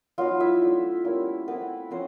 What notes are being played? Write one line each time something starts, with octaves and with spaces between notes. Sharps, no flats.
F#3 B3 D#4 F4 F5
E4 E5
A3 D4 F4
G3 A#3 C#4 E4
A3 B3 C4 E4 B4
F3 A3 C4 C#4 C5